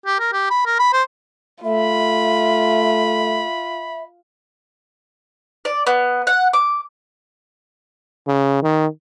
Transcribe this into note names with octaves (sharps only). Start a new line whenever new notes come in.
G4
A#4
G4
B5
A#4
B5
C5
A3 F4 E5 B5
D5
B3
F#5
D6
C#3
D#3